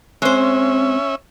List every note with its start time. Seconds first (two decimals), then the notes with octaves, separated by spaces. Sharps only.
0.22 G#3 C4 C#4 C5 E5